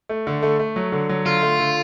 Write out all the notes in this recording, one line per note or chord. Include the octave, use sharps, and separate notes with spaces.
A3
D3
A3
A3
F#3
D3
F#3
D3 F4
A3
D3